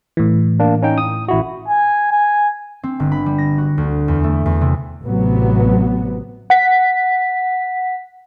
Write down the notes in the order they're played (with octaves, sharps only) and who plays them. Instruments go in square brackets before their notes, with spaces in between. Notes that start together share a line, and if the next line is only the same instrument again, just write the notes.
[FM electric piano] A2 E3
[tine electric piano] A#3 D4
C#4 D#4 G5
D#6
A1 E4 F#4
[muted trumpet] G#5
G#5
[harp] C4
G1
B5
G3
A#6
F#4
D2
E2
A3
E2
C3
[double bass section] A1 C3 F#3 B3
[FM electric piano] F#5 B6